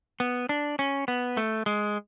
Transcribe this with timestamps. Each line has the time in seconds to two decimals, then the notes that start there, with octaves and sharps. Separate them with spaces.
0.20 B3
0.49 D4
0.79 C#4
1.08 B3
1.37 A3
1.66 G#3